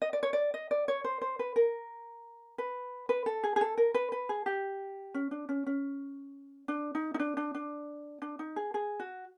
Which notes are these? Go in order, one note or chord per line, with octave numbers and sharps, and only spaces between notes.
D#5
D5
C#5
D5
D#5
D5
C#5
C5
C5
B4
A#4
B4
B4
A4
G#4
G#4
A4
A#4
B4
B4
G#4
G4
C#4
D4
C#4
C#4
D4
D#4
D#4
D4
D4
D4
D4
D#4
G#4
G#4
F#4